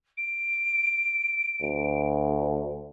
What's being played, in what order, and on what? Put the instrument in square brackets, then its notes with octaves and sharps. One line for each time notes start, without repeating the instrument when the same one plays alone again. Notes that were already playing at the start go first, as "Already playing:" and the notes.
[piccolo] D7
[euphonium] D2